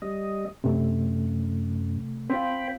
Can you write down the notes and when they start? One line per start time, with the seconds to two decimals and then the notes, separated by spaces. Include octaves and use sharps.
0.02 G3 D#5
0.64 F#2 C3 A3
2.30 C4 F4 C5 G5 B5